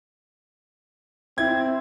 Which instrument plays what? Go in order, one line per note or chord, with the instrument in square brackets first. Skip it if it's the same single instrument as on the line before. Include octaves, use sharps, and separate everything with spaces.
[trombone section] C4 [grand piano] E4 G#6